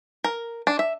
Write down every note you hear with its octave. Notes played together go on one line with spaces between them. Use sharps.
A#4
D4
E5